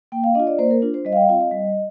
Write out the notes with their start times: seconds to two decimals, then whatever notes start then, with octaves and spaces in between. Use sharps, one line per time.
0.12 A#3 G5
0.24 F5
0.35 D4 F4 D#5
0.47 D5
0.58 A#3 C5
0.71 A#4
0.82 D4 F4
0.94 C5
1.05 G3 D#5
1.12 F5
1.16 G5
1.29 C4 F4 F5
1.41 D#5
1.51 G3